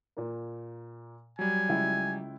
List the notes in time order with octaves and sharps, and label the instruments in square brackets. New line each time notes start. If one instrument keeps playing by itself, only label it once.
[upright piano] A#2 A#3
[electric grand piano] F#3 G3 [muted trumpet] G#5
[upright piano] C#2 E4 G5